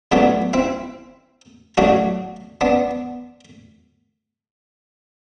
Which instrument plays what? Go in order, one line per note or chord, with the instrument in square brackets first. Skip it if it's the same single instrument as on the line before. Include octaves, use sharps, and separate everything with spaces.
[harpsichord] A2 F#3 A3 B3 D4
C4 E4
A2 F#3 A3 D4 F#4
B3 D4